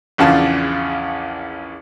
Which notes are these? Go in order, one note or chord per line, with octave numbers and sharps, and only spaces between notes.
A#1 E2 C#3 F4 A5